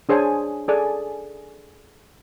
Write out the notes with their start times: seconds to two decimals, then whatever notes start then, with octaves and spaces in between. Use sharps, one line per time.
0.09 D4 G#4 C5 C#5 G#5 A5
0.68 G#4 A4 D5 G#5